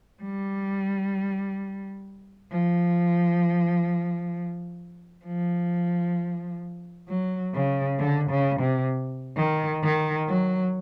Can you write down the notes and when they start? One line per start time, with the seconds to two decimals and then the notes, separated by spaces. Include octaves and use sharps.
0.22 G3
2.51 F3
5.26 F3
7.09 F#3
7.54 C#3
7.99 D3
8.30 C#3
8.60 C3
9.36 D#3
9.83 D#3
10.28 F#3